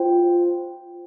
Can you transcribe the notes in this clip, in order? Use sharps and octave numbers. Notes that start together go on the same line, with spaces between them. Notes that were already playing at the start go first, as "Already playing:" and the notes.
Already playing: F4 C5 G5